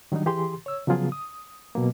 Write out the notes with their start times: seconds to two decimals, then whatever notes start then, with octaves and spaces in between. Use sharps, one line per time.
0.12 D#3 F#3 G3 D4 D#4
0.26 E3 G4 G#4 C6
0.66 C#5 E6
0.87 C#3 F3 F#3 B3 F4 G#4
1.12 D#6
1.75 B2 F#3 A#3